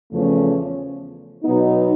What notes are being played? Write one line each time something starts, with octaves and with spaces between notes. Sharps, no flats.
E2 C#3 F3 A3 C#4
B2 F#3 B3 D#4